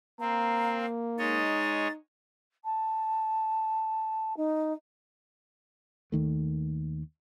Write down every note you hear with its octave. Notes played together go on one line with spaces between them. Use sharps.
A#3 C4 F5 A#5
G#3 D#4 C#5 D#5 A6
A5
D#4
D#2 D#3 A3